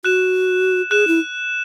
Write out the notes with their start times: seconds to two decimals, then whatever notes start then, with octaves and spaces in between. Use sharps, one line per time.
0.05 F#4 F#6 E7
0.91 G#4 F#6 E7
1.08 E4